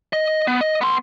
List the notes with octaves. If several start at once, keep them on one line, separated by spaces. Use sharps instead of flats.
D#5
B3
D#5
B3 C6